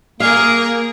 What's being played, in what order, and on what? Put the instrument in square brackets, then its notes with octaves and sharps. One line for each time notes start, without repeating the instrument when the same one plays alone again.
[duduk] A#3 [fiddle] G#4 A#4 [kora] F5